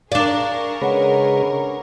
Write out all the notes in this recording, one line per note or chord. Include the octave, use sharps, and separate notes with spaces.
D4 G#4 A#4 D5 F5 C#6
C#3 G#3 B4 C#5 F#5